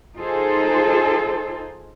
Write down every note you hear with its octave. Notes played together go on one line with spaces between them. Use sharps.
D#4 F4 G#4 A4 C5